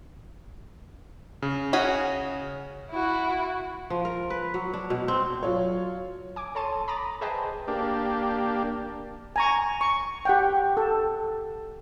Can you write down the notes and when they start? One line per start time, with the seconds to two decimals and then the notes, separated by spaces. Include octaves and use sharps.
1.42 C#3
1.73 C#4 F#4 G#4
2.90 E4 F#4
3.90 F3
4.05 A#4
4.30 B4
4.54 F#3
4.73 D4
4.90 B2
5.08 C4
5.43 F#3 F4 C#5
6.36 G#5 D6
6.55 A4 C#5 A5 C6 D#7
6.88 A#5 B5 D6 D#6 A6
7.21 G#4 B4 C5 D#5 G5 A5
7.68 A#3 D4 G4
9.36 G#5 A#5 C#6
9.81 C#6
10.25 G4 F#5 G5
10.77 A4